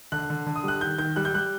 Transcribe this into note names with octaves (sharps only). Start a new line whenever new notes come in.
D3 F#6
D3
D3
D#6
G3 F#6
D#3 G6
D#3 G6
G3 F#6
G6
G3 F#6